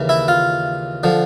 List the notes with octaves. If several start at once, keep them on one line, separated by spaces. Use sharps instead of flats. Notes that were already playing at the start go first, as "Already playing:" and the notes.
Already playing: D#2 C#3 E3
E4
F4
D3 F3